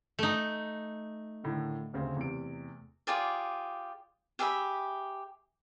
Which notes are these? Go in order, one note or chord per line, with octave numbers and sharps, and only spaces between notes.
A3 D#4
A2 D3 D#3
D2 C#3 C4
E2 C3 D7
F4 G4 G#4 D5
G4 G#4 E5 B5